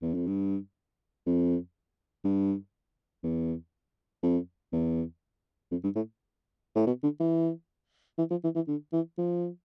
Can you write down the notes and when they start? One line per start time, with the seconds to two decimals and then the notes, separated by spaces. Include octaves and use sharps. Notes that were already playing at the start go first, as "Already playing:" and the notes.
0.02 E2
0.14 F2
0.27 G2
1.26 F2
2.25 G2
3.24 E2
4.23 F2
4.73 E2
5.71 F2
5.84 G2
5.96 A2
6.76 A2
6.87 B2
7.03 D3
7.20 E3
8.18 E3
8.30 F3
8.44 E3
8.55 E3
8.68 D3
8.93 E3
9.18 F3